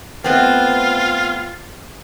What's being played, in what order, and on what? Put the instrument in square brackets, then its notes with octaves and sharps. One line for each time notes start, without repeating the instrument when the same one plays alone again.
[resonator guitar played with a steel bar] A3 B3 C4 [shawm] F4